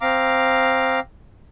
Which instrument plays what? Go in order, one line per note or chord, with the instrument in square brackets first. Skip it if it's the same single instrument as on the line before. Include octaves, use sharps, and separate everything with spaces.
[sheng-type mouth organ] C4 F5 A#5 D6